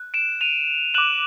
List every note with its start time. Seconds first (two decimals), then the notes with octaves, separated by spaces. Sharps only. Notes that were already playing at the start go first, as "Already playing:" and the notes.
Already playing: F#6
0.14 D7 E7
0.41 D#7 F7
0.94 D6 F#6 E7 F#7